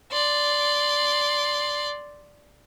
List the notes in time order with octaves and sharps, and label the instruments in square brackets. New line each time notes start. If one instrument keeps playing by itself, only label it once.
[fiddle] D5 C6